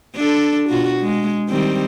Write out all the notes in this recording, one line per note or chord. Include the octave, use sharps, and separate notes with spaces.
D4 A4
B2 F4 F#4
G#3
D#3 G3 C4